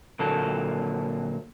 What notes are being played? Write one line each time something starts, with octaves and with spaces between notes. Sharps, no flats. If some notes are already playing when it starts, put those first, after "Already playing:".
A#2 D3 F#3 A#3 A4